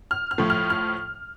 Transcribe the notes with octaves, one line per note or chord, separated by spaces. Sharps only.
F6
F6
A2 F3 A3
F6
F6